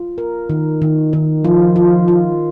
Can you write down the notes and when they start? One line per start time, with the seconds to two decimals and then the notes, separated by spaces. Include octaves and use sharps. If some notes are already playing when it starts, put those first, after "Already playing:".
Already playing: F4
0.18 A#4
0.50 D#3
0.82 D#3
1.13 D#3
1.44 F3 F4
1.76 F4
2.08 F4